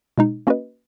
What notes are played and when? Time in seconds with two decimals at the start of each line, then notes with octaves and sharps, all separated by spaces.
0.18 B2 G#3 D#4
0.47 A#3 C#4 F#4 B4 D#5